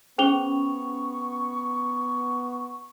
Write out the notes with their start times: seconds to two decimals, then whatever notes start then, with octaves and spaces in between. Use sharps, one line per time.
0.18 B3 C#4 G#4 C5 G5 C#6 F7 G7